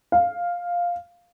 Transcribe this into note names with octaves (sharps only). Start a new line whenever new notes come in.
F5